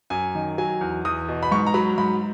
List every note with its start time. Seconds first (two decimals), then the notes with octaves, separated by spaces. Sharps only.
0.10 F#2 G#5
0.35 D#3
0.58 F#3 G#5
0.81 E2
1.05 E2 D#6
1.28 B2
1.43 B5
1.51 G#2 C#6
1.67 A#5
1.74 F#3 B5
1.98 G#2 B5